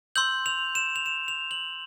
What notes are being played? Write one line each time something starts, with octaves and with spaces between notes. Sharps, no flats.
C6 E6 G6 F#7
F7
E7
F7
E7
F7
F#7